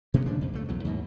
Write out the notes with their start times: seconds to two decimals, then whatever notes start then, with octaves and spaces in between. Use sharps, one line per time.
0.14 B2 A#3 B3 C#4
0.26 D#2 C#3 F3 D4
0.41 F2
0.54 C#2 A3
0.68 B1 E2 F#3
0.85 D#2 G#2 B2